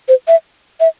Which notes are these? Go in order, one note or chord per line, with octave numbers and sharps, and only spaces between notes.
C5
E5
E5